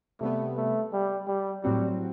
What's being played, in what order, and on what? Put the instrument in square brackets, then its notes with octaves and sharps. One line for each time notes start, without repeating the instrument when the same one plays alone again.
[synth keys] C3 G3 B3 [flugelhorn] A3
[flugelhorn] A3
G3
G3
[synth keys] A2 F#3 C4 F#4 [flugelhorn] G3